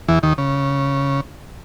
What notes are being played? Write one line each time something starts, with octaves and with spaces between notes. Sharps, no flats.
E2 E3
D#2 D#3
C#3